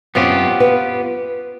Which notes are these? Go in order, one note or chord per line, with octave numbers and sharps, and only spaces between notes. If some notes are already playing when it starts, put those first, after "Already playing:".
F#2 B3 C4 F4 G4 C#5
B4